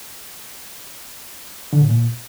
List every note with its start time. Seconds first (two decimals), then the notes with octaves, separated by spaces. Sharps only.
1.73 D3
1.81 A2
1.89 A#2